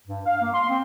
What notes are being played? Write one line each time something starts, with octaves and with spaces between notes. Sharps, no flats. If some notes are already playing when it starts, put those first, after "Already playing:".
G2
F5
A#3
C6
C4